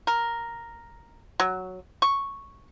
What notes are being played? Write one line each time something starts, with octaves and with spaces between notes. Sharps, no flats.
A#4
F#3
C#6